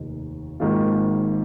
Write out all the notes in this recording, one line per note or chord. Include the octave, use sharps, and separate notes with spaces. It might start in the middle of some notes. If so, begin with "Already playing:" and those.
Already playing: F1 D#2 D#3
G#1 G#2 D#3 A#3 F4